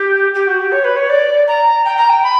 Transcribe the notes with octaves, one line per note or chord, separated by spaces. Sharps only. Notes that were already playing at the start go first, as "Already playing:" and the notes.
Already playing: G4
G4
F#4
G4
C#5
B4
C#5
D5
A#5
G5
A#5
G5
B5